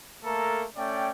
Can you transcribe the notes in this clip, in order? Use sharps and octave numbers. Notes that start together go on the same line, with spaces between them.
A3 A#3 A4 A#4 A#5
A3 C#4 D5 G5